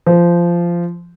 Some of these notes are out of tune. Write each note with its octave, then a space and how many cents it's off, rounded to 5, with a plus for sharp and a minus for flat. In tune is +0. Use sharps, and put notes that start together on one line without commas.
F3 -15